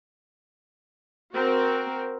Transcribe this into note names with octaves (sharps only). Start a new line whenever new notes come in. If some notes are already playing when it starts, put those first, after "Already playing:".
C4 F#4 A#4